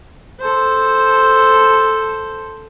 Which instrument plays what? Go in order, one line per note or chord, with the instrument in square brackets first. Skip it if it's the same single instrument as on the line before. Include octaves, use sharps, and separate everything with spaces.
[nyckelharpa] A4 C5